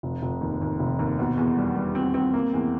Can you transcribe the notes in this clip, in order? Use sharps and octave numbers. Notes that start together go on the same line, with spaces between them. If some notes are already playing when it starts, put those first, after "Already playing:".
F1
F1
D#2
D#2
F1
D#2
B2
E2
G3
G3
C4
C4
A#3
E2